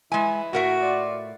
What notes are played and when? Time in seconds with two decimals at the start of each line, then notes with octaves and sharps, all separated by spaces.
0.12 E3 G#3 E4 G#5
0.53 A2 F#4 A#4 E5
0.80 F4 D5